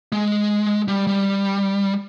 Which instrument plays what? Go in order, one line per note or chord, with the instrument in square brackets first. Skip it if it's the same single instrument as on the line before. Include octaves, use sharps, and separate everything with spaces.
[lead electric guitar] G#3
G3
G3